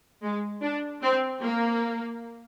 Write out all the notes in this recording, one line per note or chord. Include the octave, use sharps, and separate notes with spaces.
G#3
D4
C4
A#3